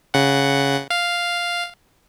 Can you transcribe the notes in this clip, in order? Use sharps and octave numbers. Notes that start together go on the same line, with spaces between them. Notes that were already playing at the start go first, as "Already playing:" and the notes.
C#3 F#5
F5